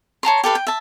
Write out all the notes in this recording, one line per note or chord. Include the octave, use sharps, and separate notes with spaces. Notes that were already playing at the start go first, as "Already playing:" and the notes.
C#5 A5 A#5 C6
G4 A4 B4 F5
G5
E5 A5